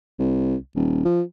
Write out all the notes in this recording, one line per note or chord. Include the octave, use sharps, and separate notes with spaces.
C2
D#1
F3